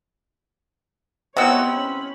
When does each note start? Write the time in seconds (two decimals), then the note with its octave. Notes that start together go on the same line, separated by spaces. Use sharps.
1.37 C3 B3 C4 E4 C#5 D#5 F#5 E6
1.66 C#4 B5